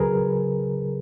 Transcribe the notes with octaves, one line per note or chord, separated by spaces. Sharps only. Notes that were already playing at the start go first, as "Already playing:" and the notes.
Already playing: C#2 C#3 F#3 G#4 A#4 B4